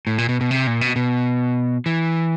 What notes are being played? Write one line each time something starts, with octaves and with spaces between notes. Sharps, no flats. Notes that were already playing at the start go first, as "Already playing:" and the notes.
A2
A#2
B2
B2
C3
A#2
B2
B2
E3